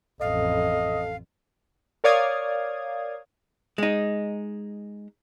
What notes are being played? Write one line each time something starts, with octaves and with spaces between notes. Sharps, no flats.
A1 F2 A4 D#5 F5
A#4 C#5 D5 F5 D#6 G#6
G#3 D#4